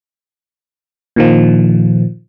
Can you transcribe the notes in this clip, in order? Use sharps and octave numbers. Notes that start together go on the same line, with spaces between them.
A#2 D#3 F3